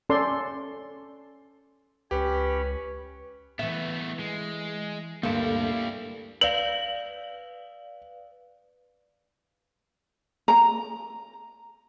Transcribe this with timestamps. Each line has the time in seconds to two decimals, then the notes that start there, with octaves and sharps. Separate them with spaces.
0.10 C#4 A4 D5 C6
2.11 C#2 C#4 G4 B4 C#5 B5
3.59 E3 A3 B3 E5
4.19 G#3
5.23 D2 G2 G3 A#3 E4 A4
6.41 B4 D5 F5 F#7
10.48 A#5